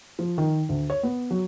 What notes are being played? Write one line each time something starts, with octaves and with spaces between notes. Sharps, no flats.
F3
D#3
D2
C#5
B3
F#3